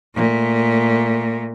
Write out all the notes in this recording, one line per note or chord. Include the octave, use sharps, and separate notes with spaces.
A#2 A3